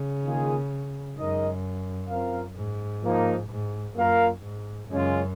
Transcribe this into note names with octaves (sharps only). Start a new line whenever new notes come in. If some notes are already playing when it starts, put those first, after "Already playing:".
Already playing: C#3
D#3 A#3 F4 G#4
F#2 G#3 D#4 A#4 D#5
C4 F4 A#4 F5
G#2
F3 A#3 D#4
G#2
F#2 A#3 F4 A#4 F5
G#2
F#2 C#3 G#3 C#4 F4